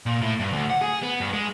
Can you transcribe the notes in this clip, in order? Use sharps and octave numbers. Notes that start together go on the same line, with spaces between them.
A#2
A2
G2
D2
F#5
G#4
B3
G2
G#3